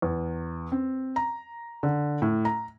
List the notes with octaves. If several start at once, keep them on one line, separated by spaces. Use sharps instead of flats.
E2
C4
A#5
D3
A2
A#5